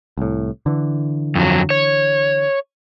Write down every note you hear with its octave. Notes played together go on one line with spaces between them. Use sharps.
C2 A2
D3 E3
F2 F#3
C#5